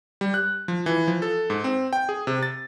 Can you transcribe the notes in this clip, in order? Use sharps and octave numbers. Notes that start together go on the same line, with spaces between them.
G3
F#6
F3
E3
F3
A4
G#2
C4
G5
G#4
C3
A6